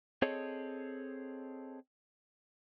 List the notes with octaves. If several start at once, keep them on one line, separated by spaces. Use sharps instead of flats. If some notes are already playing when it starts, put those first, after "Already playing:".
C4 G#4 A4 C#5 D#5